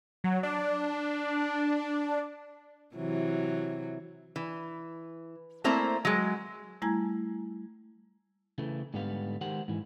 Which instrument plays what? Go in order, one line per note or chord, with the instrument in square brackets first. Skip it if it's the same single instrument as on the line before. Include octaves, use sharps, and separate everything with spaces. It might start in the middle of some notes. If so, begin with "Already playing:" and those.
[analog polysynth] F#3
D4
[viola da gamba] C3 E3 F#3
[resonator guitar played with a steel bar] E3
A3 A#3 C4 E4 C5 A#5
F#3 G#3
[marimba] G3 A3 E4 G#5 A#5 G#6
[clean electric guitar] C#3 E3 A3
G#2 D3 G3 B3 F5
D#3 G#3 G4 A#4 C5 F#5
G#2 E3